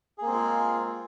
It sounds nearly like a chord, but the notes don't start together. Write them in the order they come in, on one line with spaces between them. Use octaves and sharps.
G#4 A#3 C4 G#3 F4